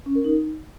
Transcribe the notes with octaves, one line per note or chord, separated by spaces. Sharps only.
C#4
A#4
D#4